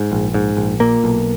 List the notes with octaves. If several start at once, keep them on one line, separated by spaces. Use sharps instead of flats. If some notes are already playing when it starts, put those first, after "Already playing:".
Already playing: G#2
A#1
G#2
A#1
A#2 A#3
B1